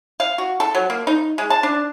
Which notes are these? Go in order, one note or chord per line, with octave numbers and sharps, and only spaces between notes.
F5
F#4
A4
F#3
A#3
D#4
G#3
A5
D4